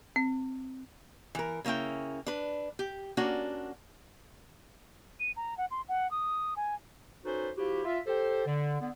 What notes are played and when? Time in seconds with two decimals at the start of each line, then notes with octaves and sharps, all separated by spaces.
0.16 C4
1.35 E3 A#4
1.65 C#3 A#3 C#4 E4 G5
2.26 D4 B4
2.79 G4
3.17 A#3 C#4 D4 F#4
5.20 D#7
5.36 A#5
5.58 F#5
5.71 C6
5.89 F#5
6.11 D#6
6.56 G#5
7.24 C#4 D#4 F#4 A4 B4 C5
7.57 F3 E4 F#4 G4
7.84 F4 E5
8.07 G4 A4 C5
8.46 D3
8.80 D3 B3